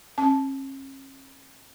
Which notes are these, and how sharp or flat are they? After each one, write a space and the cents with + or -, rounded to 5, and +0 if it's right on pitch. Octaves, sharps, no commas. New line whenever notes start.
C#4 -40 A5 -15